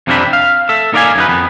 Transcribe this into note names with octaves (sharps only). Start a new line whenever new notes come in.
F2 C3 A#3 C4 D4 B5
F5
A4 E5
A#3 D#4 A#4 D5 F5 G#5
F#2 D#4 B4
F2 B3